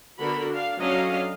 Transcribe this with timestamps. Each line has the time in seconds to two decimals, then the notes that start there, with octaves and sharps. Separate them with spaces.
0.18 D3 B3 F#4 A#4 B5
0.50 D4 F5
0.79 F#3 C#4 D4 A4 D#5 F5